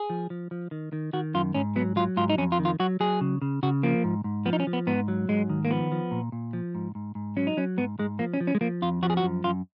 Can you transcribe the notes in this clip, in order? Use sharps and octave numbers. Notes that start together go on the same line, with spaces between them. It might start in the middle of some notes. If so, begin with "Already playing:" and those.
Already playing: G#4
F3
F3
F3
D#3
D#3
D#3 F#4
F#2 F4
G#2 C#4
F#3 B3
F#3 F4
G#2 F4
D#4
F2 C#4
F4
D#3
F4
F#3 F#4
F#3 G#4
C#3
C#3
C#3 F#4
F3 A#3
G#2
G#2
F3 B3
D#4
C#4
F3
B3
G#2 B3
F#3
G#2 G#3
D#3
A#3
F3 B3
F3
A#2
A#2
F3
G#2
G#2
G#2
F#3 C#4
D#4
F#3 C#4
G#2 B3
G#2 G#3
F3 A#3
C#4
F3
C#4
G#3
F3 A#3
F2 F4
F3 F#4
G#4
F#4
F#2
F#2 F4